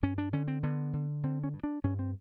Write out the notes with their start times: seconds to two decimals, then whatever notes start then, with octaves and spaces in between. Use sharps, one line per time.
0.03 G2 C#4
0.18 D4
0.33 D3 C#4
0.48 C4
0.63 D3 B3
0.93 D3
1.23 D3 C4
1.44 C#4
1.54 G2
1.63 D4
1.84 G2 C#4
1.99 C4